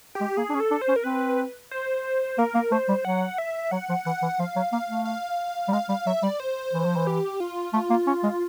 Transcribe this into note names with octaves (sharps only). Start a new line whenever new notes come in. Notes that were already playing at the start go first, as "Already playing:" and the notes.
G4
G#3
A#3 G#4
D4
C#4
A4
D4
C5
C#4
A#4
C4 B4
C5
A#3 A#4
A#3
A3 C5
G3
F#3 F#5
E5
F#3 F#5
F3
E3 F#5
E3
F3 F5
F#3
A#3 F5
A3
F5
G3
G#3 F5
G3 F5
F#3 E5
G3 D5
C5
E3
F3
E3
G4
F4
A3 F4
A#3
C#4
G#3